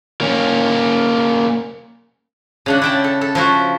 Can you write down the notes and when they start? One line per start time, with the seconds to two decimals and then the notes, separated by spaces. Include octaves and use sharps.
0.21 A#3 C#4
2.66 C#3 D4 F#5
2.82 E4 G5 A5
3.04 A4
3.21 A4
3.35 F3 E4 F#4